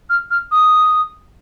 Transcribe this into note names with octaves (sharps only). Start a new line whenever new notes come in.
F6
F6
D#6